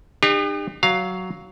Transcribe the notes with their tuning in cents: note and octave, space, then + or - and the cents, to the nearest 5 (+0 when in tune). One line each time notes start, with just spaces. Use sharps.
D#4 -45 G4 +40
F#3 +5 F5 +0